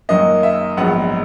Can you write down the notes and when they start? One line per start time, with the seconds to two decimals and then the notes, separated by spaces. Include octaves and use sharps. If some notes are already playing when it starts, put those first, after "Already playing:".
0.09 F#2 D#3 F#3 A#3 D#5
0.43 E5
0.77 A#1 G#2 F#3 B3 F#5